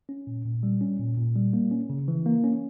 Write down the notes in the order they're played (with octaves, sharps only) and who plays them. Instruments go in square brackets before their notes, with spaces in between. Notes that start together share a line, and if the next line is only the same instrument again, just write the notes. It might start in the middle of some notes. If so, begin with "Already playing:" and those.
[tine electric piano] C#4
A#2
A#2
G3
C#4
A#2
A#2
G3
A#3
C#4
C#3
E3
A#3
C#4